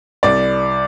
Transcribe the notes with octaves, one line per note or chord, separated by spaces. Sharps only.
C2 D5